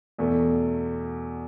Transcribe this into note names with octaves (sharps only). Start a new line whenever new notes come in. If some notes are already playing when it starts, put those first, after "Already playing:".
E2 B2 A3